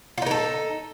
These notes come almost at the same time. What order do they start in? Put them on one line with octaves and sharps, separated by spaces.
F4 D#4 A#4 A4